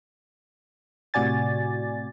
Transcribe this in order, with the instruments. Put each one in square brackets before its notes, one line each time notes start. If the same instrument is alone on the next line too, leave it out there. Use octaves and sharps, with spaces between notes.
[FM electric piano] A2 C3 F#4 D5 G#5 A6